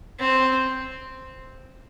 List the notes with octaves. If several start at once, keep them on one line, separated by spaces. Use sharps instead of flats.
C4